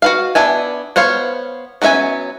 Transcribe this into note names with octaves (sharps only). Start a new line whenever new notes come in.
F#4 B4 F5
B3 D4 E5 G#5
B3 C5 C#5 F5
F#3 B3 C#4 E5 G#5